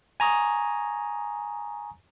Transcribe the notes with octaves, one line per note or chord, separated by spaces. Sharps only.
G#5 A#5 C#6 D#6